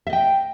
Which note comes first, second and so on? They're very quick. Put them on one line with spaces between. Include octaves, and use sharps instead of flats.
E5 D#5 G5